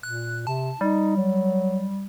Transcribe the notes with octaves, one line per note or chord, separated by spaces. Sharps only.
A#2 F#6
C3 A5
G3 D#4
F#3